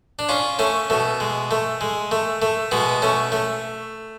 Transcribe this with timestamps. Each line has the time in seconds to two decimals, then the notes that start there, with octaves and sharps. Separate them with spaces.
0.19 D4
0.29 C#4 F4
0.59 A3 C#4
0.90 B2 A3
1.20 G#3
1.51 A3
1.81 G#3
2.11 A3
2.42 A3
2.71 B2 G#3 B3
3.02 A3 C#4
3.32 A3